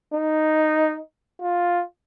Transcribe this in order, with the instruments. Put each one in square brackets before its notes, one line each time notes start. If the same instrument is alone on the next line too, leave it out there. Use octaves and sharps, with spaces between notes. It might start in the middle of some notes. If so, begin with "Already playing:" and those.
[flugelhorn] D#4
F4